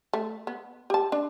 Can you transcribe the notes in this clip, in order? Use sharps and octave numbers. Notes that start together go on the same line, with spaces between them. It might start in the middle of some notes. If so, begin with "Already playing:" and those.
A3
B3
G4 A5
D4